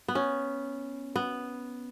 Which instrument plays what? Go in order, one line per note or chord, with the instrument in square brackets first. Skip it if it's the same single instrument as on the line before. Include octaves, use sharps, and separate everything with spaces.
[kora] B3
C#4
B3